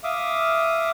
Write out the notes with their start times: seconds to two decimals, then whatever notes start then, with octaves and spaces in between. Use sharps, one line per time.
0.04 E5 F5 D6 D#6